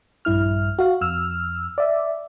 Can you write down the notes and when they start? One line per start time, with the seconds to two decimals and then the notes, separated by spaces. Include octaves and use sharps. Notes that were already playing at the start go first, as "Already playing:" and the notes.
0.25 A#1 G2 E4 F6
0.79 F#4 F5
1.01 F2 E6 F6
1.78 D5 E5